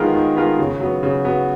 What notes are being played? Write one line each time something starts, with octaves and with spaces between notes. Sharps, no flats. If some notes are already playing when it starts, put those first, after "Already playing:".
Already playing: D#3 G#3 B3 F4 A#4
D#3
G#3 B3 F4 A#4
C#3
F#3 B3
C#3
F#3 B3